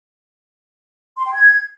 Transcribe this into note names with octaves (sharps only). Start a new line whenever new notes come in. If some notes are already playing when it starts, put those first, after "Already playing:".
C6
G5
G#6